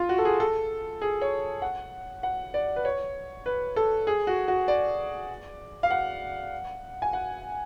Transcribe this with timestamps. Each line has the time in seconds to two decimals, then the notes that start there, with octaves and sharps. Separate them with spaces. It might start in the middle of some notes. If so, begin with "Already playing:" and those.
Already playing: F4
0.09 F#4
0.18 A4
0.25 G#4
0.40 A4
1.02 G#4
1.21 C#5
1.62 F#5
2.23 F#5
2.54 D5
2.76 B4
2.85 C#5
3.46 B4
3.76 A4
4.07 G#4
4.27 F#4
4.48 F#4
4.68 D5
5.83 F5
5.91 F#5
7.02 G#5
7.13 F#5